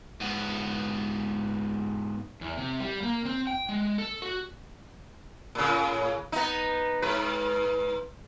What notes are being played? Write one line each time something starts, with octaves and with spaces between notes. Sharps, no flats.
G#2 B3
E2
C3
G3
A#3
C4
G5
G#3
A4
F#4
A2 C#3
B3 D#4
G#2 B4